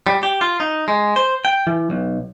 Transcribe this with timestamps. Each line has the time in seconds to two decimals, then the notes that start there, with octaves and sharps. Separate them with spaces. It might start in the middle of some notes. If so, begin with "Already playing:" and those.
0.07 G3
0.23 G4
0.41 F4
0.60 D#4
0.88 G#3
1.16 C5
1.45 G5
1.67 E3
1.90 B1